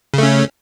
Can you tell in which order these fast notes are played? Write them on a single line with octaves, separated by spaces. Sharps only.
C#3 A3 C#4